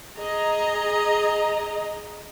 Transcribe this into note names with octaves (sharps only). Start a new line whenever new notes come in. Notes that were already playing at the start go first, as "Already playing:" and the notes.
G#4 D#5 A#5